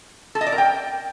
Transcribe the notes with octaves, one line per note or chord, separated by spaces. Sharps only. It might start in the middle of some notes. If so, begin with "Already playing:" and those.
A4
D#5
D5
A#4
G5